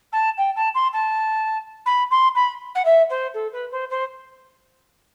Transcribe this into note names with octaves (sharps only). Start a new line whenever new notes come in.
A5
G5
A5
C6
A5
B5
C6
B5
F#5
E5
C5
A4
B4
C5
C5